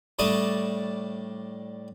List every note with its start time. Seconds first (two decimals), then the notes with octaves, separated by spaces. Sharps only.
0.19 A2 G3 D4 A5 C#6 D#6